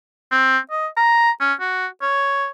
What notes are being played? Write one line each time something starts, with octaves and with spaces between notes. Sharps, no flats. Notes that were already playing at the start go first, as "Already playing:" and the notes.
C4
D#5
A#5
C#4
F#4
C#5